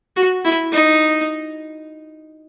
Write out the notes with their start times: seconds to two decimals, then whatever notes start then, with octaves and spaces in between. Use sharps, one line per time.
0.16 F#4
0.45 E4
0.73 D#4